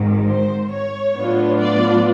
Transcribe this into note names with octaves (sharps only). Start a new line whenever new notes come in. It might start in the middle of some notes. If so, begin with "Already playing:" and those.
Already playing: G#1 G#2 D#3
C5
C#5
A2 F#3 B3 D4 F4
D5